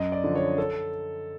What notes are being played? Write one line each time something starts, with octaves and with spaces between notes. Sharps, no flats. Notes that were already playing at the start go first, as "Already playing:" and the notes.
Already playing: F#2 D#5
D5
D3 F3
C#5
A4